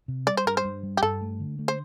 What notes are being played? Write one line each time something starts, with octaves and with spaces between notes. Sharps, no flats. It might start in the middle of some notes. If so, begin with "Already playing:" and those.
C3
G3 D5
C5
G2 A#4
C5
G2
G3
G4
G2 A4
A3
D3
A3
C5